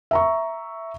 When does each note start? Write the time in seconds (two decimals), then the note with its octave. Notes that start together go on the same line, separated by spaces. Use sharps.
0.11 E5 A#5 C#6